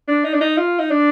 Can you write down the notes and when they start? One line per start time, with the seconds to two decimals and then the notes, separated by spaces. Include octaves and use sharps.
0.08 D4
0.24 D#4
0.34 D4
0.41 D#4
0.57 F4
0.79 D#4
0.91 D4